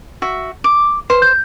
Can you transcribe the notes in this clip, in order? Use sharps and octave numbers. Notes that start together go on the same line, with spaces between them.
F#4 E5
D6
B4 C5
G6